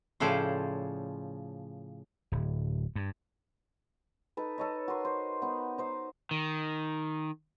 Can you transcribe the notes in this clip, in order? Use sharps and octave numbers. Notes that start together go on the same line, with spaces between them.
A2 C#3 F3 A4 C5 D5
D1
G2
D#4 A4 B4
A4 C#5 D#5
F#4 A#4 C6
C5
B3 D#4
D#4 C5
D#3